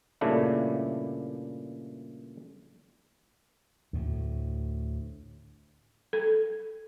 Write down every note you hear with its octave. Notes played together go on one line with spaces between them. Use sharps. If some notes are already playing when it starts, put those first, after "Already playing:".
G2 A#2 C#3 A3 D4 E4
D2 A2
A4